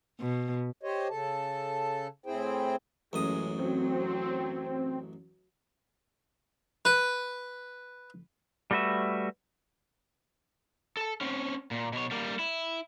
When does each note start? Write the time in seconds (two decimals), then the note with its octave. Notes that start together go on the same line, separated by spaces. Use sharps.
0.20 B2
0.83 G4 C5 C#5 D#5
1.10 C#3 A4 A5
2.26 A2 C4 E4 G#4 C5 G5
3.13 A1 F#2 G#3 D#6
3.58 F#3 C4
6.85 B4
8.71 G3 A3 F#4 B4 E5
10.97 A4 A5
11.21 C4 C#4
11.71 A#2
11.93 B2 C#5
12.11 G3 A#3
12.39 E4